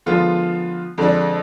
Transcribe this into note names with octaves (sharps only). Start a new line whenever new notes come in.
D3 F3 G#3 B3 F4
F2 D3 G#3 D4